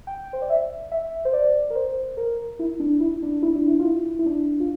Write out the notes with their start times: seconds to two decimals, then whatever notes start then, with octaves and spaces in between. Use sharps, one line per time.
0.07 G5
0.33 C5
0.42 D5
0.50 E5
0.92 E5
1.25 C5
1.33 D5
1.70 A#4
1.75 C5
2.17 A#4
2.59 E4
2.80 D4
3.00 E4
3.22 D4
3.43 E4
3.55 D4
3.67 E4
3.79 F4
3.85 E4
4.19 E4
4.26 D4
4.60 F4